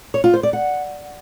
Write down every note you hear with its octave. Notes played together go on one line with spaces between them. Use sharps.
C#5
F4
C5
D5
F#5